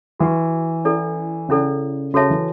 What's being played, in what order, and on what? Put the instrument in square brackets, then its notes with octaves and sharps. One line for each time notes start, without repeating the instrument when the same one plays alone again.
[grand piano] E3 [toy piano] F#4 B4 F#5 C#6
[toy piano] C#4 E4 A4 D5
[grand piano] C#3 [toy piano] C#4 E4 A4 D5
[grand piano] C#3 [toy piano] F#4 A4 C#5 E5 A5
[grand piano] E3